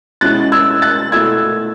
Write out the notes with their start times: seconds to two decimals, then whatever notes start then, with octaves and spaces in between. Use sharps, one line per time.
0.21 B2 G#3 C#4 E4 F#6 A6
0.52 E6 G#6
0.82 F#6 A6
1.12 B2 A3 E4 E6 G#6